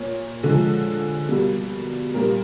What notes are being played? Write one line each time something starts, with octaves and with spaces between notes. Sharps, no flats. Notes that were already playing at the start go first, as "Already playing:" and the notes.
Already playing: A#2 A#3 C#5
D3 F3 G#3
B2 G3 A#3
A#2 G3 A#3 A#4